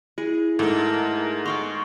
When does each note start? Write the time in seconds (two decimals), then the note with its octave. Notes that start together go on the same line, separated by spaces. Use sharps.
0.18 E4 G#4
0.59 G#2 A3 A4 A#4
1.15 A#4
1.46 F5 G5 A#5 C6 C#6